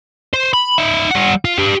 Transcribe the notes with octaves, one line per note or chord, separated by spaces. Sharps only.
C5
B5
D#4 E5
G3 F#5
F4
G4 B4